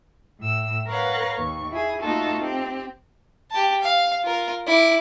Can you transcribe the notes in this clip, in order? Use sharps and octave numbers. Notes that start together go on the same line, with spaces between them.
A2 E6
A#4 B4 C#5 F5 F#5
D#2 C#6
E4 G#4
A3 A#3 D#4 F4 F#4 A4
C4 G4
G4 A5
F5
F4 A#4
E4 D6